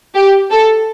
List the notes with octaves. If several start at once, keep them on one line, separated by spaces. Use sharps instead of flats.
G4
A4